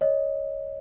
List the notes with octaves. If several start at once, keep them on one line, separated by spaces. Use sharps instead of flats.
C#5 D#5